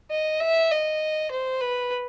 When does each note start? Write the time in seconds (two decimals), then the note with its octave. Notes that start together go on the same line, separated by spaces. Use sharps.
0.11 D#5
0.40 E5
0.71 D#5
1.31 C5
1.61 B4